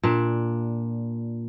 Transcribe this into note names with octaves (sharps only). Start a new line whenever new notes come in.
A#2 D4